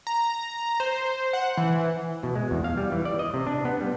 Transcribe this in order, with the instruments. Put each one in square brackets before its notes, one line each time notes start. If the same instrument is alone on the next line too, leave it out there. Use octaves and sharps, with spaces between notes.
[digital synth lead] A#5
C5
F#5
E3
[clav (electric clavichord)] B2
G#3
E2
F5
G3
E3
D5
D#5
C3
D4
B3
G3